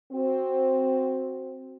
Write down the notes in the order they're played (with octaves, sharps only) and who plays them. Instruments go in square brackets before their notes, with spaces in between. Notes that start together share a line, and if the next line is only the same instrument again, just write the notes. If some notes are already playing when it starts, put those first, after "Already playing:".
[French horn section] C4 F#4